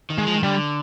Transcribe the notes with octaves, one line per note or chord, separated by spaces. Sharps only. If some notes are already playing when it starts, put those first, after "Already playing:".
D#3
G#3
F3
D#3
D3 G3